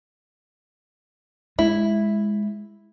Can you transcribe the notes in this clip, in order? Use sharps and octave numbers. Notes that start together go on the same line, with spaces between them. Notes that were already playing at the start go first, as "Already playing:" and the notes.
G#3 E4